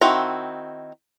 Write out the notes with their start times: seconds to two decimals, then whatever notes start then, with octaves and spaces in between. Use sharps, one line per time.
0.01 D#3 C4 E4 F#4 A#5